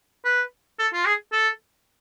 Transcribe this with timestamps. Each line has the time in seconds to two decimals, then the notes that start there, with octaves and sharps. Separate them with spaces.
0.25 B4
0.79 A4
0.93 F4
1.05 G#4
1.32 A4